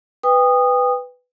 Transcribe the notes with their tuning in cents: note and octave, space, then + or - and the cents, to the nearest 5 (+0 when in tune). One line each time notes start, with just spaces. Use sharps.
B4 +10 G5 +30 D#6 -15